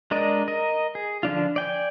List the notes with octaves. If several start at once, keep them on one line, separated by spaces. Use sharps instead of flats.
G#3 D4 A#4 D5 D#5
A#4 D#5
G#4
D3 F3 D4 F4
D5 G5 G#5